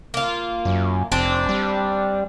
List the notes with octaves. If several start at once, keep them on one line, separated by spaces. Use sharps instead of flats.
A#3 F4
F#2
F1 C4 D4
G3